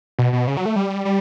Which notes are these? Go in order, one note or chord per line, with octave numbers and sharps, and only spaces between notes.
B2
B2
C#3
F#3
A3
G3
G3